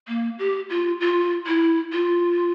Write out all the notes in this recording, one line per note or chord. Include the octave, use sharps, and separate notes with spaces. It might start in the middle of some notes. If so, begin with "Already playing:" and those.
A#3
G4
F4
F4
E4
F4